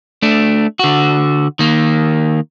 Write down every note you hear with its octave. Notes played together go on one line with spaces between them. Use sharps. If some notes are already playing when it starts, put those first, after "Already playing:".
A3 D4
D3 F#4
D#3 A#3